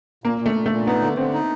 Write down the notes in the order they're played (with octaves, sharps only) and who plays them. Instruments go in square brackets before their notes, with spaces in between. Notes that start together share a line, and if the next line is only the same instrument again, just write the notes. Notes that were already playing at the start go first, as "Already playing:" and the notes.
[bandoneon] A#2 [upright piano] A#3
[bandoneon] A#2
[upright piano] A3
[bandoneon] A#2
[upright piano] A3
[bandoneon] A#2
[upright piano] B3 [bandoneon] D#4
[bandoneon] D3
[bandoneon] D3 [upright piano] C4
[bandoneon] D#4